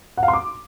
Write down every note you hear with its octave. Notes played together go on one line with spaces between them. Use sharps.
F#5
F5
C6
D6